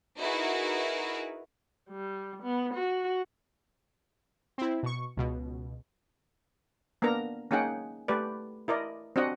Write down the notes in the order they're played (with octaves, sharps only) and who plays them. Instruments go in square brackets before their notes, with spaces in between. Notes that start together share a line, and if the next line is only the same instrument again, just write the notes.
[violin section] D#4 E4 F#4 G#4 A#4 B4
[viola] G3
B3
F#4
[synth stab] C4 E4
B2 C#6
C#2 B2
[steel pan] A#3 B3 D4 A#4 A#5
A#3 C#4 D#4 G#4 F#5 G5
A3 G4 B4 D5
E4 A#4 D5 D#5
C4 D4 F#4 D#5 F#5